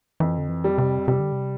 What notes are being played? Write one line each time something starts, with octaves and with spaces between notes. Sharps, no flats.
F2 E3
D3
E3
G3
C3
C3 G3
D3
C3